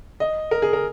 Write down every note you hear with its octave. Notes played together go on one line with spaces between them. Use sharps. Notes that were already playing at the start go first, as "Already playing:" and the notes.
D#5
A#4
G#4
A#4